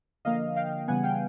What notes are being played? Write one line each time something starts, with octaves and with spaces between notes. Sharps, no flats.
D3 F3 A#3 D#5 F5
F5 G5
C#3 E3 G3 B3 F#5 G#5
F5 G5